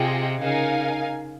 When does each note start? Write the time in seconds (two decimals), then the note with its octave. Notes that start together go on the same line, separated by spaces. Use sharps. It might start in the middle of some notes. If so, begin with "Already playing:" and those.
Already playing: C3 F4 G#4 D#5 G5
0.41 C#3 D#4 A#4 F5 G#5